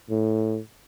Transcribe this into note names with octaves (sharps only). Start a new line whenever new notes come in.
A2